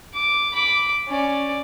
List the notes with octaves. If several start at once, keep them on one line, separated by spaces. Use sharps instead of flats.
D6
B5 D6
C#4 D5